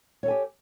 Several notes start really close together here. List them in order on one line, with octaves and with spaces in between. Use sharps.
C#5 A4 G#5 G4